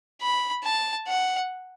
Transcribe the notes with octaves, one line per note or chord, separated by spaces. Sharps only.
B5
A5
F#5